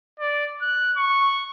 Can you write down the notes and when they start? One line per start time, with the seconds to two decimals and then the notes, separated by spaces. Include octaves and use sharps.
0.20 D5
0.61 F#6
0.97 C#6